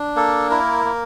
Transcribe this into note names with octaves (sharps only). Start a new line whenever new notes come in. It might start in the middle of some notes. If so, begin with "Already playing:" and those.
Already playing: D4
A#3 A4
E4 A#4
A#3